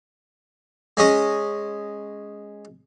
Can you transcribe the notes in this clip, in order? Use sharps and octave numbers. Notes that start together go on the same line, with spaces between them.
G#3 C#4 D#5